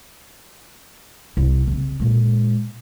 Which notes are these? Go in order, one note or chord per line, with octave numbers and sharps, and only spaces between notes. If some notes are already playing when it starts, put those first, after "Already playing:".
C2
C#3 C4
A#2 G#3